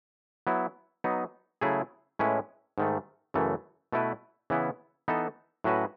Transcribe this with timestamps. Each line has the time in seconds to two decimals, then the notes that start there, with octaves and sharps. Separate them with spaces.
0.47 F#3 B3 E4
1.04 F#3 B3 D#4
1.61 C#3 F#3 A3 E4 G#4
2.19 A2 G#3 C#4 E4 B4
2.78 G#2 D#3 A3
3.34 F#2 C#3 E3 A3
3.92 B2 A3 E4 B4
4.50 C#3 E3 B3 E4
5.08 E3 B3 D#4 A4
5.64 A2 F#3 C#4 F#4 B4